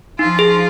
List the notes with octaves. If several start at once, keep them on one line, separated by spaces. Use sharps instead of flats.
F3 D#4 F4
G#4